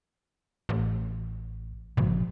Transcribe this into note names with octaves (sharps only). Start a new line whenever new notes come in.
A1
G#1 A#2 C#3 F3